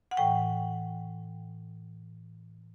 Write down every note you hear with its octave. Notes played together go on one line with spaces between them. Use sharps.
F#5
A2 E3 G5